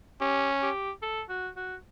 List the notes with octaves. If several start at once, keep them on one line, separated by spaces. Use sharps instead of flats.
C#4 G4
G4
A4
F#4
F#4